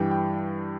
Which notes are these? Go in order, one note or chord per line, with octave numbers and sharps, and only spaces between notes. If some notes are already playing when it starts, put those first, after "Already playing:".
Already playing: G2 E3 G3 G5
G5